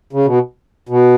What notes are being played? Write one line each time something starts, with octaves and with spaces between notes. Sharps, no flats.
C#3
B2
B2